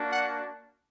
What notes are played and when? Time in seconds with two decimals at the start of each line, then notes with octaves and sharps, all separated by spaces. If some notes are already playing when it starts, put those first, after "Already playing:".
Already playing: A#3 D4 F#4
0.10 F#5